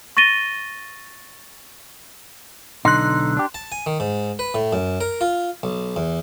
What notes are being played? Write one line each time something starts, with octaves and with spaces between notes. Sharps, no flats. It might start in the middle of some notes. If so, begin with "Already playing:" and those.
C#6 A6 A#6 D#7 G7
B1 D3 D#4 C6 F#6
D4 G4
A5
G#5
D#3
G#2
B4
A2
F#2
A#4
F4
B1
E2